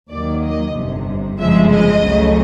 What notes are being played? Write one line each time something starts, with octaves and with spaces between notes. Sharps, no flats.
D#2 D#3 F#3 D5
D#5
G1 F2 C3
G1 F2 C#3 F3 G#3 E5
D#5
C#2 C#3 F#3 A3